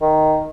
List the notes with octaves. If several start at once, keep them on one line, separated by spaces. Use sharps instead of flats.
D#3